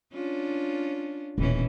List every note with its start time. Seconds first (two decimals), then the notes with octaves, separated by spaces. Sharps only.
0.13 C#4 D4 F4
1.38 D#1 B2 E3 C#4